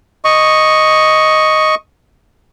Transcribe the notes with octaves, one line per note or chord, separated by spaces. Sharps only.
D#5 C#6